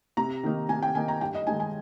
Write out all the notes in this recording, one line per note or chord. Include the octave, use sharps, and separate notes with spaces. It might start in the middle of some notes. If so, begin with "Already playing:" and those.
C3 A#5
D#3 A#3 D#4
C3 G#5
G5
D#3 A#3 D#4 G#5
A#5
G2 G5
D#5
D#3 G#3 D#4 G#5
G#5